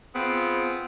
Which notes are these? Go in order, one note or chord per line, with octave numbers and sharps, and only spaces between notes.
B3 C4 F4 G#4